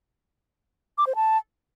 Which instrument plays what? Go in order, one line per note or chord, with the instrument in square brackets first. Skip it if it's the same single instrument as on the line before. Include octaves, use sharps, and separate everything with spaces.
[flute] D6
C5
A5